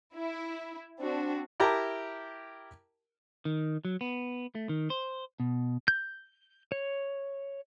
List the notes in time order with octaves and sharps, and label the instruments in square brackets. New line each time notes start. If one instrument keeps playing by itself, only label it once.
[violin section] E4
C4 D4 F#4
[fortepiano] E4 G4 A#4 A5 A#5
[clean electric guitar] D#3
F#3
B3
A3
D#3
C5
B2
[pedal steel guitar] G6
C#5